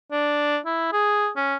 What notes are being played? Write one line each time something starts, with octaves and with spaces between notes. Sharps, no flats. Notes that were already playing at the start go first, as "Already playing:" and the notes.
D4
E4
G#4
C#4